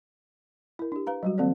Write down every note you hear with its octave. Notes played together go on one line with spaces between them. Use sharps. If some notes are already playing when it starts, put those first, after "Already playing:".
E4 A#4
D4 G4
B4 F5 A#5
F#3 G3 F#4
D#3 F3 A#3 C4 A4 D5